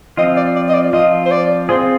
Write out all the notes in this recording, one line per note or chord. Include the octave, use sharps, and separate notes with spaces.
F3 C4 F4 D#5
D5
D5
D#5
D5
F3 C4 F4 D#5
C5
D5
C4 F4 G#4 C5